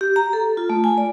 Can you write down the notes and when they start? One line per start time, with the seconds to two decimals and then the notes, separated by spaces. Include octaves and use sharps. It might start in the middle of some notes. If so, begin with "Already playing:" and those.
0.01 G4
0.16 A#5
0.33 A4
0.57 F4
0.70 A3
0.84 G#5
0.98 D5